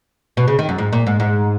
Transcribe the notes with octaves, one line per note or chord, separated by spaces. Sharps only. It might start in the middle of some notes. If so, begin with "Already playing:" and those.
B2
C#3
D#3
F#2
G#2
A#2
G#2
G#2